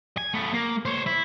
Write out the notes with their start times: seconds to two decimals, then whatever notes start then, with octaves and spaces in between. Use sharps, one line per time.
0.18 G#5
0.34 A3 B3
0.54 A#3
0.85 C5 C#5
1.06 E4